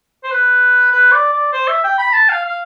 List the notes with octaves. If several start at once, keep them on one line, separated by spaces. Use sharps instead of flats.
C5
B4
B4
D5
D5
C5
E5
G5
B5
A5
F5
F5